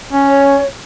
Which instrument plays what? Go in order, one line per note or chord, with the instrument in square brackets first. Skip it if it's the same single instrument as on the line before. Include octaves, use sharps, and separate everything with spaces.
[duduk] C#4
[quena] C#5